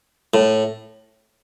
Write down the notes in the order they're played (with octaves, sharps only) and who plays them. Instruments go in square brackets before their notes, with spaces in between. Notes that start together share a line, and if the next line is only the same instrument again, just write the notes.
[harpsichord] A2